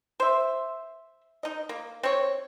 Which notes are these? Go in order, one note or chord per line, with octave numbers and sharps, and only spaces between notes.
C5 E5
D#4 D#5
A#3
C4 C#5